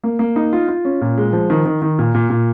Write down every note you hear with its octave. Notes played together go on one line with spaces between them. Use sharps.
A#3
A#3
D#4
F4
F4
C#4
A#2
G#3
F3
D#3
D#3
D#3
A#2
A#2
A#2